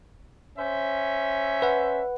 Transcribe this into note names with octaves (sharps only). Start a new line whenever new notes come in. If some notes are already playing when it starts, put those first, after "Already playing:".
C#4 C5 E5
B4 F#5